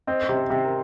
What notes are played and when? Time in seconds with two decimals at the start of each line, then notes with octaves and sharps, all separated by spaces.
0.07 C4 D#5
0.29 C3
0.37 C5
0.50 C3
0.65 A#4